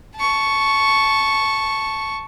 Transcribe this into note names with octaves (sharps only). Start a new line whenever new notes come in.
A5 C#6